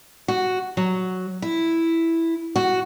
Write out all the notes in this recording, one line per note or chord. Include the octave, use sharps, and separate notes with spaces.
F#4
F#3
E4
F#4